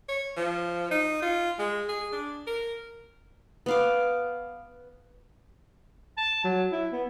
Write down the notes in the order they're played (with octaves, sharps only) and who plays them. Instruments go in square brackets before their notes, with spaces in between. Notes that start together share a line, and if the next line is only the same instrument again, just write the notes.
[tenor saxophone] C#5
F3
D#4
F4
G#3
G#4
D4
A#4
[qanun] B3 F5 D6
[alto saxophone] A5
F#3
E4
B3